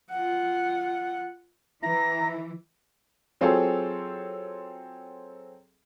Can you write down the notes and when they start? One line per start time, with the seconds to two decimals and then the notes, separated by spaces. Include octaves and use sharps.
0.11 F4 F#5
1.83 E3 E4 A#5 A#6
3.41 F#3 C4 F4 G#4 A4 C#5